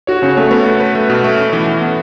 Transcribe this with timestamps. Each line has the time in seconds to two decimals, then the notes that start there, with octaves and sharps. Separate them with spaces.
0.07 F#4 C#5
0.22 C#3 C#4
0.37 A3 C#5
0.51 A3 B3
0.66 A3
0.80 B4
0.95 A3
1.10 B2
1.24 A3
1.38 C#4
1.53 E3
1.67 E3
1.82 B3